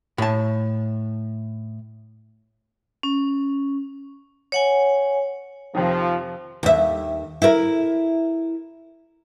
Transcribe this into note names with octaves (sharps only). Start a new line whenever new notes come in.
A2 A5
C#4
C#5 F#5 G#5
F2 C3 D#3 F3
D#2 E5
E4 A#4